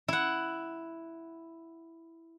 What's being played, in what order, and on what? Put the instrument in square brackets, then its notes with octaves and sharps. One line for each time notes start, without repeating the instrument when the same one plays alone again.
[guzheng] E4 F#5